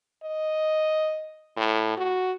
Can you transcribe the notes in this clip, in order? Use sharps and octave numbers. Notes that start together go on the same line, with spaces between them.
D#5
A2
F#4